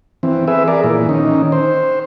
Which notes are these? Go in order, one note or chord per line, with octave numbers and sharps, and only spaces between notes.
E3 C4
G#4 B4 E5
G#4 A#4 D5
A#2 E3
D#3 C#4 D#4
C5